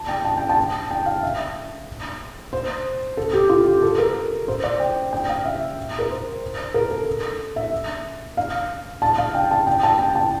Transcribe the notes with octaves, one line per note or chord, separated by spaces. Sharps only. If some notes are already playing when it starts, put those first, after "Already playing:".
Already playing: A5
G5
A5
G5
A5
G5
F5
E5
C5
A4
G4
F4
G4
A4
A#4
C5
D5
G5
G5
F5
E5
A#4
C5
A#4
A4
E5
F5
A5
F5
G5
A5
G5
A5
G5
A5